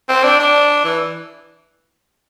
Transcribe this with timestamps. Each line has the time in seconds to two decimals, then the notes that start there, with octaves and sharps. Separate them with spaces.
0.09 C4
0.24 D4
0.39 D4
0.85 E3